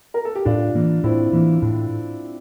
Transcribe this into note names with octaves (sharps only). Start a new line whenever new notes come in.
A#4
A4
G4
A2 D4 F4
E3 A#3
A2 C4 E4
E3 A#3
A2